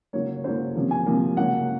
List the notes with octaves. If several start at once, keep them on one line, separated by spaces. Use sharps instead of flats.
C#3 F#3 A#3 C#5
C#3 F#3 A#3 C5
C3 F3 A#3
G#5
C3 F3 A#3
C#3 F#3 A#3 F#5